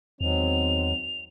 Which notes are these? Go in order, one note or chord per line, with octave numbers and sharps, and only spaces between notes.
E2 D#3 F#3 G#3 B3 C4 F7